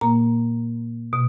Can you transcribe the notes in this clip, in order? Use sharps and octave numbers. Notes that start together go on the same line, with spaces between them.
A#2 A#3 A#5
B2